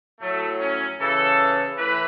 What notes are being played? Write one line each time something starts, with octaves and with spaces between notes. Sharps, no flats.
A2 F#3 A3
C#4
C#3 E3 A4
A2 E3 B4